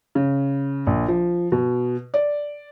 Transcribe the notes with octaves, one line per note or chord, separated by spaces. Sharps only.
C#3
A#1
F3
B2
D5